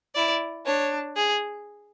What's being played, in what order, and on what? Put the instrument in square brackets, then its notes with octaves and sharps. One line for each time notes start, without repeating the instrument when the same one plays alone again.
[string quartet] E4 [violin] D5
[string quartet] D4 [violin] C#5
[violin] G#4